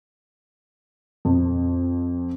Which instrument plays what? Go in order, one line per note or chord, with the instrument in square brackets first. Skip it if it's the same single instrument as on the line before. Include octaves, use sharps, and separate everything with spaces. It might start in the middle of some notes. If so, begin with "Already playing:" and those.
[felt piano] F2